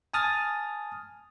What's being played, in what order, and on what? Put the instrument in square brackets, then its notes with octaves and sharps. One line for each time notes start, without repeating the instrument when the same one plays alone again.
[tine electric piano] G#5 A5 D#6 F6 A6